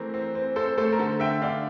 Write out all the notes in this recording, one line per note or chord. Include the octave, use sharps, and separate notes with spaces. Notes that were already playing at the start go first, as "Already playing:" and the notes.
Already playing: E3 A3 C4 A#4 C5
C4
C4
C4 A4 C5
A3 A4 C5
A#4
D3 A4
D3 E5 G5
D3 D5 F5